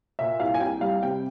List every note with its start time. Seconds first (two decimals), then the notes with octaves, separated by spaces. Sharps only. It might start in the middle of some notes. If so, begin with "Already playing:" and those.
0.19 A#2 E5
0.40 C2 F5
0.54 G#5
0.60 C2 G5
0.81 G3 F5
1.03 C3 G5